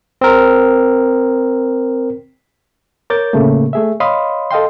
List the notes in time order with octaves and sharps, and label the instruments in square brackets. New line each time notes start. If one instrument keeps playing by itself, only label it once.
[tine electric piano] C4 A#4
[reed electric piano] A#4 C#5 D6 G6 A6
A2 C#3 A3 A#3
A3 G#4 E5
C#5 D#5 F5 B5 C6 D#6
A4 D#5 F5 G5 C6